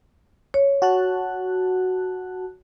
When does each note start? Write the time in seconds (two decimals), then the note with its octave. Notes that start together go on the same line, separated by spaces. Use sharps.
0.54 C#5
0.82 F#4 A5 F#6